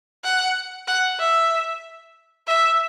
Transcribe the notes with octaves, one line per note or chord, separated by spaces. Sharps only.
F#5
F#5
E5
E5